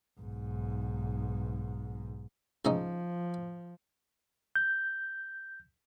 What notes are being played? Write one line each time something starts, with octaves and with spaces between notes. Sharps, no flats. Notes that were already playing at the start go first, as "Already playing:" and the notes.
B1 G#2
C#2 F3 C#4 D#4
G6